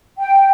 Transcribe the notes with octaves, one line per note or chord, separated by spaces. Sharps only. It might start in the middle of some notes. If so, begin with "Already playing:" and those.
G5